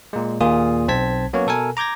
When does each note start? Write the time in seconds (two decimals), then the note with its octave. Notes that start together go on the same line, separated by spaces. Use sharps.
0.13 A#2 G#3
0.41 D#2 A#2 A#3 F4 G#4 D#6
0.88 B1 C4 C5 A5 G#6 B6
1.33 F#3 A#3 B3 C#4 C#5
1.47 B2 A4 A#4 G#5
1.77 A#5 D6 G6 G#6 A#6